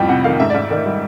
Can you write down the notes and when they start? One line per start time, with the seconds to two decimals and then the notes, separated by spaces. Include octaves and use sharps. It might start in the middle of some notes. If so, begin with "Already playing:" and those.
Already playing: F2 A2 G3 G5
0.09 C3 F#5
0.24 D#3 F5
0.40 G#2 E5
0.50 G#2 D5
0.70 D#3 D5
0.86 G3